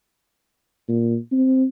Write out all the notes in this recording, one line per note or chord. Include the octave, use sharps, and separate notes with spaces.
A#2
C4